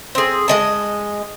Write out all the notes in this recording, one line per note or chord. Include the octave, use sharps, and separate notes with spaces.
C4 G#4
G#3 D#5 A5